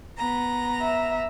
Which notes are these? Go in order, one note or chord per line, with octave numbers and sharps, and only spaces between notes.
B3 A#5
E5